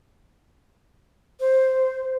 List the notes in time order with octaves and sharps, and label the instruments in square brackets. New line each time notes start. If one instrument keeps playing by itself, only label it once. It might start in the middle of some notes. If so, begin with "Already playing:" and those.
[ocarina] C5